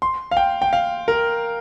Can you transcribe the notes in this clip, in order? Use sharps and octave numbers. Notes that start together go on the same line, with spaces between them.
C6
F5
G5
G5
F5
A#4